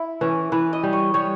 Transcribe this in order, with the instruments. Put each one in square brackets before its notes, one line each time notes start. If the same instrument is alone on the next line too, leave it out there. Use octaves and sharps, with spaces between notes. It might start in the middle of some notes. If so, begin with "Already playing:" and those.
Already playing: [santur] E4
[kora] E3 [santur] C#4
[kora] E3 [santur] B4
[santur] D#5
[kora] G3
[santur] C#5
[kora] G3 [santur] C#5